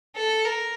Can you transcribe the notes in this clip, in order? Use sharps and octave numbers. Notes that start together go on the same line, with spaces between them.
A4
A#4